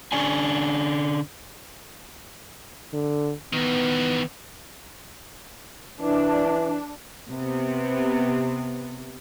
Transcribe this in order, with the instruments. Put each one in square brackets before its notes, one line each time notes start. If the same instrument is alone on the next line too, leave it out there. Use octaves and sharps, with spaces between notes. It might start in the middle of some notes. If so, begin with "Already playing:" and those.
[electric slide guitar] D3 C#4 D4 G#5
[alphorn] D3
[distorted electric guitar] D#3 E3 [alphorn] B3
[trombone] E3 [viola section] D4
[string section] C3 B3